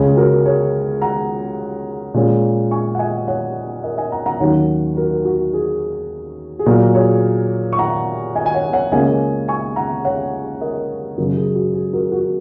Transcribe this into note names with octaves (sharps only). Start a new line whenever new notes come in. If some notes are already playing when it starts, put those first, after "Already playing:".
Already playing: C#2 C#3 G#3 C#4
F#4 A#4
G#4 C#5
F#5 A#5
A#2 G#3 C#4
G#5 C#6
F#5
D#5 G#5
C#5 F#5
A#4 D#5
D#5 G#5
F#5 A#5
F#5 A#5
D#2 D#3 F#3 A#3 C#4 C#5 F#5
F#4 A#4
F#4
G#4
G#4
A#2 F#3 A#3 F#4 A#4
G#4 C#5
C#6
F#5 A#5
D#5 G#5
G#5
C#5 F#5
C#5 F#5
C#2 C#3 A#3 C#4 D#5 G#5
G#5 C#6
F#5 A#5
C#5 F#5
A#4 D#5
F#2 C#3 F#3 F#4 A#4
G#4
F#4
G#4
F#4 A#4
F#4